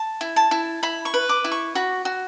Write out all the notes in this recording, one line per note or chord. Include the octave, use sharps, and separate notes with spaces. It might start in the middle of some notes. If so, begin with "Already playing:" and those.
Already playing: A5
E4
A5
E4
E4 B5
C#6
B4
D6
E4
C#6
F#4 B5
F#4